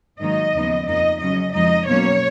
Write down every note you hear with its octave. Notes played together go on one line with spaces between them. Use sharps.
G#2 D#3 F#3 A#3 D#4 D#5
D#2 C#3 F3 B3 D#4
F2 F3 A#3 D#4 D#5
C#3 F#3 C#4 D#5
F2 F3 G#3 D#4 D#5
B2 F#3 A#3 C#4 C#5